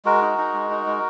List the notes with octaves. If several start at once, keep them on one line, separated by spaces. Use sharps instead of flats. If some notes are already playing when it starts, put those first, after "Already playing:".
G#3 F#4 A#4
D#4
D#4
G#3
D#4
G#3